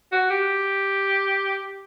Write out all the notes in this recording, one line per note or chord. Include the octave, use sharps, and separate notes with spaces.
F#4
G4